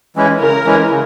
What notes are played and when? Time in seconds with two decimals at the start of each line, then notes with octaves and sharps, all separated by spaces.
0.16 E3 G#3 C#4 E4
0.40 C#3 A#4
0.65 E3 G#3 C#4 E4
0.90 C#3